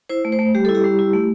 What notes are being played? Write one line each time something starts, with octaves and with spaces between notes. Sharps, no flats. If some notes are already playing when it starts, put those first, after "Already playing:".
E4 C5
A3
C5
A3
G3 G4
E4 A4
G4
G3
E4
A3